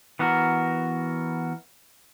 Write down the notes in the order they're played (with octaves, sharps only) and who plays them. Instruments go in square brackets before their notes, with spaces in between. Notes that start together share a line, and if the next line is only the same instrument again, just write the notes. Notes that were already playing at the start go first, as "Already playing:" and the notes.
[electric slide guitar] E3 B3 F#4 A#4